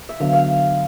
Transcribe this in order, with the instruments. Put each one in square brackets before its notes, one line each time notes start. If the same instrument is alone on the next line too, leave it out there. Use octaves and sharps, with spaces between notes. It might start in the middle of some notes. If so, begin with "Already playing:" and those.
[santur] E5
[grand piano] D3 F#3 B3 [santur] F5
[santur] F5